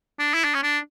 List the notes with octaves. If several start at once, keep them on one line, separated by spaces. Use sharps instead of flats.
D4
E4
D4
C#4
D4